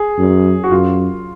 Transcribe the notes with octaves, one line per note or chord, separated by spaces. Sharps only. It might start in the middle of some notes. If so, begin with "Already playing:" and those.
Already playing: G#4
F#2
F#4
F#2 F4